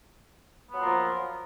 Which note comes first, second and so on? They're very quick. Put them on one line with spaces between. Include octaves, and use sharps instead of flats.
B3 F#3 F4 A#3 F3